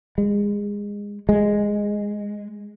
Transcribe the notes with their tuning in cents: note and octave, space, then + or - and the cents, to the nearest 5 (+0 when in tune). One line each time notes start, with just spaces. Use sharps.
G#3 -25
G#3 -5